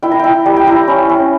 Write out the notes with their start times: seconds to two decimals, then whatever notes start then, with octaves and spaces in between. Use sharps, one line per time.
0.03 E4 G5
0.11 A#5
0.19 E4 G5
0.46 G3 A#5
0.56 G5
0.67 E4 A#5
0.88 C#4
1.09 C#4